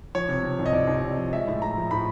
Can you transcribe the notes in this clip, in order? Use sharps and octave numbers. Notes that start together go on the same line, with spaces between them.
F3 C#5
C3
C3
C2
D#5
C2 D5
C2
C3
F3
G#3 E5
A2
A2 A#5
F3
A2 B5